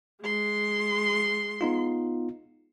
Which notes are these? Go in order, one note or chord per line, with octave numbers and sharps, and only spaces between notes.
G#3 C6
B3 D#4 F4